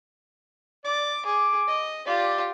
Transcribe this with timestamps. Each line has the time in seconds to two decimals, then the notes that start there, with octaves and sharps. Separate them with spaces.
0.85 D5 D6
1.26 G#4 D6
1.67 D#5
2.07 F4 G4 D5